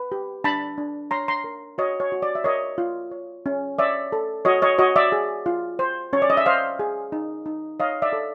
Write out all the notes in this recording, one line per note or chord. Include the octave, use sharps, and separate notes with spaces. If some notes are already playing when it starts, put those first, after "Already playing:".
Already playing: B4
G4
D4 A5 B5
D4
C#5 A#5 C6
A#5 C6
A#4
F#4 C#5 D#5
C#5
F#4
D5
E5
A#4 C#5 D#5
F4
C#5
C#4
C#5 D5 E5
A4
F#4 C#5 D#5
C#5 D#5
F#4 C#5 D#5
D5 E5
G#4
F4
C5
C#4 C#5
D5
D#5
E5
C5 D#5 F5
G#4
D#4
D#4
C#5 D#5 F5
D5 E5
A4